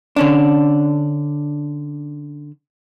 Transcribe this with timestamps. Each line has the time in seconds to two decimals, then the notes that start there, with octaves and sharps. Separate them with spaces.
0.16 D3 C#4 D4